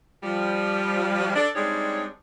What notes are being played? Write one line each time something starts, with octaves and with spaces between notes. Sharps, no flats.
F3 G3
D4 A4 D5
G3 G#3 C4 D4 D#4 C#5